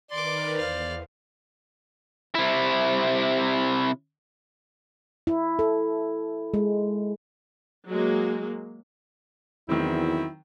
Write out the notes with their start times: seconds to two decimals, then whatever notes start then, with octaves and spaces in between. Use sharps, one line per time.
0.11 D#3 A#4 B4 D5 C6 D6
0.56 E2 C5 F5
2.35 C3 E4
5.27 E4
5.59 A4
6.54 G#3
7.88 F#3 G#3 A#3
9.69 E2 D#3 F#3 C4 E4